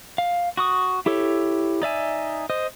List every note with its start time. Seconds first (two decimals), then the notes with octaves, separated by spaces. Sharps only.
0.18 F5
0.57 F#4 C#6 D#6
1.06 E4 G4 A4 C#5
1.82 D#4 D5 E5 G#5
2.50 C5 D#5